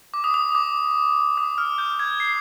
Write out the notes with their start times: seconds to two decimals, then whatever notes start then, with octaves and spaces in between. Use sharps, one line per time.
0.14 D6
0.24 D#6
0.34 D#6
0.55 D6
1.38 D#6
1.58 F6
1.78 G6
1.99 G#6
2.20 C7